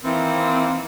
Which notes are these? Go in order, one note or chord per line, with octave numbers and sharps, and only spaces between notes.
D#3 E3 A#3 C4